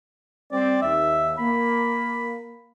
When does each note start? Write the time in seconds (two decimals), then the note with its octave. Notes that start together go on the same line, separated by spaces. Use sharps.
0.52 G3 C4 D5
0.82 D#2 E5
1.38 A#3 B5